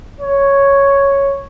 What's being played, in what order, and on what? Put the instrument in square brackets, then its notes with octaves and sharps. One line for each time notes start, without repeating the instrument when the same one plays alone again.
[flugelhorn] C#5